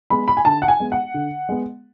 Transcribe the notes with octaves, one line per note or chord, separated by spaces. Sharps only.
G#3 B3 B5
B5
G#5
D3 A5
F#5
G#5
G#3 B3
F#5
D3
G#3 B3